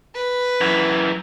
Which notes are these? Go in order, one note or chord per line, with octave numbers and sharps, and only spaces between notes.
B4
F#2 E3